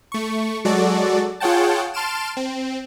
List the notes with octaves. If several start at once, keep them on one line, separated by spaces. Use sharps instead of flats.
A3 C#6
F#3 G#3 F#4 A4 D5
F4 G#4 C#5 F#5 G5 A5
A5 C6 F6 D7 E7
C4